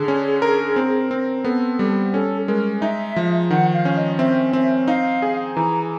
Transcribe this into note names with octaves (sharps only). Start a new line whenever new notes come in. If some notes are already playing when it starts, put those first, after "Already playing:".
Already playing: D3 G#4
C#4
A#4
C4
C4
B3 A4
G3
C#4 A4
G#3 A#4
D#4 E5
F3
D#3 F#5
F5
C#4
D#5
C4 E5
C4
D#4 F5
G#4
E3 A#5